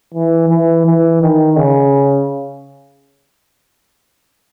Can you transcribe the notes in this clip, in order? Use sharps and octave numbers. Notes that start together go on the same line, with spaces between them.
E3
E3
E3
D#3
C#3